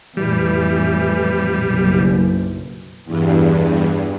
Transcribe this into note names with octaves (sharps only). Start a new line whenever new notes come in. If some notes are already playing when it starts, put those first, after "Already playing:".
F2 A2 E3 G3
F#1 B1
E2 G2